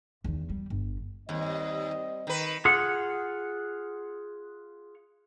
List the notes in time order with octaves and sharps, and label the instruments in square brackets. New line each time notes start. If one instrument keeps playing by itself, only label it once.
[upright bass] E2 D#3
G3
G1
[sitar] D#2 [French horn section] G3 C4 D#5
[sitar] D#3 B4
[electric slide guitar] F4 G#4 F#5